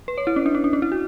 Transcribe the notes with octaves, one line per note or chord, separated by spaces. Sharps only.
B4
C#5
E4
C#4
D4
C#4
D4
C#4
E4
F#4